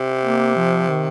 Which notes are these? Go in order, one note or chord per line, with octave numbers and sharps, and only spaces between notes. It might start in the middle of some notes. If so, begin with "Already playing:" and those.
Already playing: C3
A#3
F3
D#3